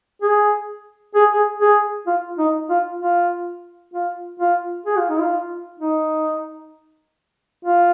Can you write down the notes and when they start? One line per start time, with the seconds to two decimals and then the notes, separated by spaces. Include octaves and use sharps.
0.22 G#4
1.15 G#4
1.33 G#4
1.61 G#4
2.07 F4
2.39 D#4
2.70 F4
3.00 F4
3.94 F4
4.40 F4
4.86 G#4
4.98 F4
5.10 D#4
5.20 F4
5.80 D#4
7.65 F4